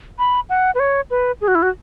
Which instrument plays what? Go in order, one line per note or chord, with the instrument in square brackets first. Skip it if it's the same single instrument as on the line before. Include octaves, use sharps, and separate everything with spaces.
[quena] B5
F#5
B4
C#5
B4
G#4
F#4
E4
F#4